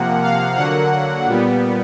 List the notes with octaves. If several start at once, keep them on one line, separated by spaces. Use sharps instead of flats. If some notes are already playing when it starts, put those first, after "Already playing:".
Already playing: C3 F3 A#3 F#5
F5
D3 F#3 A#3 F#5
A#2 G3 B3